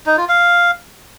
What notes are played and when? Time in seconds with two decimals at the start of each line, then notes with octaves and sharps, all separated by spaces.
0.06 D#4
0.17 F4
0.29 F5